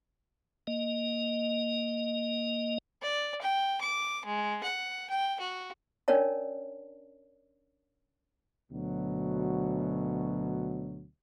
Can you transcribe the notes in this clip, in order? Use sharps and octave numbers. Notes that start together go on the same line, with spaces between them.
A#3 D#5
D5
G5
D6
G#3
F#5
G5
F#4
C#4 D4 A#4 C#5 D5 A5
D2 B2 F#3